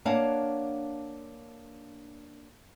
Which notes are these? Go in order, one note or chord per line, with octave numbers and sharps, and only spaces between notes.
A#3 D4 C#5 F5 F#5 A5